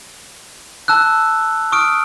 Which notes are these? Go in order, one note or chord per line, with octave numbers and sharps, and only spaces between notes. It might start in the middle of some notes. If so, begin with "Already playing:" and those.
A5 E6 F#6
C#6 D#6 F6 D7